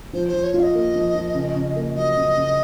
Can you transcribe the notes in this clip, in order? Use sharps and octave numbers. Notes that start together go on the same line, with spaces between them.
F3 C5
C5
F3
C#5
F4
F5
D#5
A#3
F3
F3
C#3
C#3
A#3
F#3 D#5
C#3
C#3